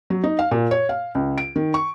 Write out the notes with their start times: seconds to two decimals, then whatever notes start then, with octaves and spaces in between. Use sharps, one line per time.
0.10 F#3
0.24 D#4
0.39 F5
0.51 A#2
0.71 C#5
0.89 F5
1.15 C#2
1.38 D7
1.56 D#3
1.74 C#6